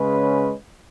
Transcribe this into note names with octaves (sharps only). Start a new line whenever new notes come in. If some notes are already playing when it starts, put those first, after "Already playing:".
Already playing: C#3 G#3 C#4 G#4 B4